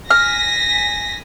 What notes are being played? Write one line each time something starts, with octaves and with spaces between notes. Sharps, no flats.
G#5 F6 A#6 B6